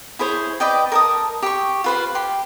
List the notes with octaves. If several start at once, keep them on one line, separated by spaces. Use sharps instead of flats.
E4 G#4 C5 C#5
B4 D5 D#5 G5
A#4 A5 D#6
G4 C#6
F4 B4 C5
G4 C6